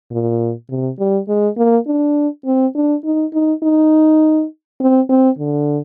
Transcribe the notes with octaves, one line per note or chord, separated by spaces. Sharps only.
A#2
C3
G3
G#3
A#3
D4
C4
D4
D#4
D#4
D#4
C4
C4
D3